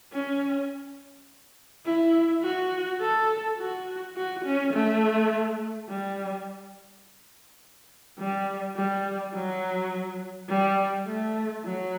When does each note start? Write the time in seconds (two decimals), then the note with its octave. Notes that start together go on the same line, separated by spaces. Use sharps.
0.13 C#4
1.86 E4
2.43 F#4
3.01 A4
3.59 F#4
4.17 F#4
4.45 C#4
4.74 A3
5.89 G3
8.18 G3
8.76 G3
9.34 F#3
10.49 G3
11.07 A3
11.64 F#3